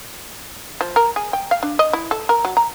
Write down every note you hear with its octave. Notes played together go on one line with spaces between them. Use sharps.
F3
A#4
G#4
G5
F5
D4
D#5
E4
A4
A#4
F#3
A#5